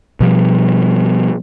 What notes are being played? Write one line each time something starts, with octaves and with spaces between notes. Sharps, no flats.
B2 F3 G3